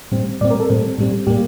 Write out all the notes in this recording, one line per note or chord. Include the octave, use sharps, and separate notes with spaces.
A2 G3 C4
A2 G3 C4 D5
A#4
A4
A2 G3 C4
A2 G3 C4
A2 G3 A#3 G4